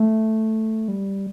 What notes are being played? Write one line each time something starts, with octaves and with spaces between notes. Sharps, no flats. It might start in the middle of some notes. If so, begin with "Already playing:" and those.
Already playing: A3
G3